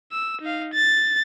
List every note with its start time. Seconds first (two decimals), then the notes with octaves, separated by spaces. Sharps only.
0.12 E6
0.42 D#4 F5
0.74 A6